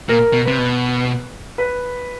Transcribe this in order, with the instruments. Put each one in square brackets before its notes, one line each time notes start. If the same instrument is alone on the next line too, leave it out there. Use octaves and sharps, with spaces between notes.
[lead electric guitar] A#2 [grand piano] A#4
[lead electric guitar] B2
[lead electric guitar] C3 [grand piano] B4
[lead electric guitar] B2
[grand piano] B4